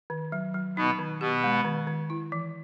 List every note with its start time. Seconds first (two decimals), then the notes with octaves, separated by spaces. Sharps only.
0.10 D#3
0.32 F#3
0.54 F#3
0.77 B2 B3 D#4
0.99 D#3
1.20 B2 B3 G4
1.44 G#3
1.65 D#3
1.87 D#3
2.10 E4
2.32 E3